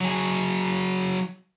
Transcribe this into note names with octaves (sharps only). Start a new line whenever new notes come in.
F#3 G#4